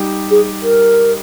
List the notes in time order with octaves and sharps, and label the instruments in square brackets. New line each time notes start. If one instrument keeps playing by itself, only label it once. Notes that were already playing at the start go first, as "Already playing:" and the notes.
Already playing: [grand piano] G3 D#4 G4
[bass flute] G#4
A#4